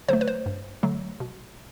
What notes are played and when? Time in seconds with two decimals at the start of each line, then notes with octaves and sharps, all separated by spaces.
0.09 D3 F#3 A3 C5
0.21 B4
0.28 C5
0.46 G2
0.83 D3 F#3 A3
1.20 B2